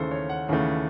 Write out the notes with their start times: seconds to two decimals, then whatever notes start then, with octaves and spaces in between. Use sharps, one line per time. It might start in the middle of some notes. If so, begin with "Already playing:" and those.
Already playing: D#2 C#3 E3 A3 A4 C5
0.11 C#5
0.29 F#5
0.48 D#2 C#3 E3 A3